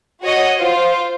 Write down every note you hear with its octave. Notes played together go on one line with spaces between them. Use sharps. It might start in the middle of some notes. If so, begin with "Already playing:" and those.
F#4 C#5 D#5
F4 C5